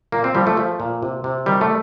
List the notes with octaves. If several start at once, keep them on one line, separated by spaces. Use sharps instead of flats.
A#2 A#3
C4
F3 G3
A3
F3
A#2
C3
C3
D#3 G3
A3